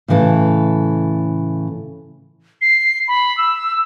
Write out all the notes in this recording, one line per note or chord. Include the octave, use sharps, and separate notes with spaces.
A2 C#3 E3 A4
C7
B5
E6